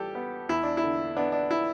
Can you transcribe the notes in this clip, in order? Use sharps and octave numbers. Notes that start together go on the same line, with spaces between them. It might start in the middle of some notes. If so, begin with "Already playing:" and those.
Already playing: E3 G3 G4 A4
B3
E2 E4
D4
E4
D3
B3 D4
D4
E4